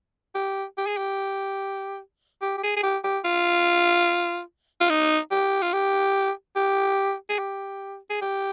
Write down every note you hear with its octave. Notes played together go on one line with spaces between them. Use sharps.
G4
G4
G#4
G4
G4
G4
G#4
G#4
G4
G4
F4
F4
D#4
G4
F4
G4
G4
G#4
G4
G#4
G4